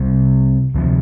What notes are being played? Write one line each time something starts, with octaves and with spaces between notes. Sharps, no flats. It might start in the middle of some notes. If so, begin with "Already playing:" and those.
Already playing: C2 C3 G3
D2 C3 F3